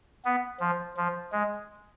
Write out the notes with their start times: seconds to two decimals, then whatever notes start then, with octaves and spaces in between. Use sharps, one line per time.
0.25 B3
0.60 F3
0.97 F3
1.32 G#3